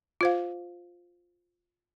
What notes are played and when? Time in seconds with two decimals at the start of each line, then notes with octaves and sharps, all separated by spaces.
0.21 F4 C5 F5